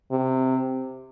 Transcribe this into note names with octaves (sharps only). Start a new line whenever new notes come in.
C3